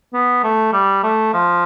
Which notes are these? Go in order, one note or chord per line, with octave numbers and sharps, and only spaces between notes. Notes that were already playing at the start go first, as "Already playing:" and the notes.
B3
A3
G3
A3
F3